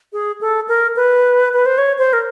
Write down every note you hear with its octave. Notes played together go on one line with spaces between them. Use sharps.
G#4
A4
A#4
B4
B4
C5
C#5
C5
A#4